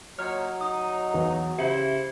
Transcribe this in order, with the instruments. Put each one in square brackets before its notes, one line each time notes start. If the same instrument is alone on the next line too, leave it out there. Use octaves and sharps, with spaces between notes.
[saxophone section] A#2 D#4 C#5 [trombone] F#3 [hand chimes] F6
[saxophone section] D#4 [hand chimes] D#6
[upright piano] B1 E2 E3
[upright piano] C#3 F#7 [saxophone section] E4 C5 [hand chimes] G4 E5 C#7